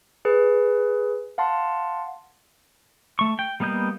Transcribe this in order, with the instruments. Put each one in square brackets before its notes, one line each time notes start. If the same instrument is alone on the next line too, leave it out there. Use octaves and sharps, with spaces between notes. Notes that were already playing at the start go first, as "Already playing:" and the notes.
[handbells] G#4 B4
F5 F#5 A5 C6
[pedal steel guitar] A3 C#6
G5
G3 A#3 B3 D#5 G6